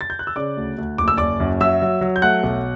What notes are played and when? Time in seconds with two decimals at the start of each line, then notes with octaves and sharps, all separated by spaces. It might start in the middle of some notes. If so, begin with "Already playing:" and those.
0.01 A6
0.10 G6
0.19 F#6
0.27 E6
0.36 C#3 D5 D6
0.57 D2
0.78 D2
0.98 F#1 D6
1.08 E6
1.17 F#1 D5 D6
1.40 F#2
1.61 F#3 E5 E6
1.82 F#3
2.01 F#3
2.16 G6
2.22 A3 F#5 F#6
2.43 B1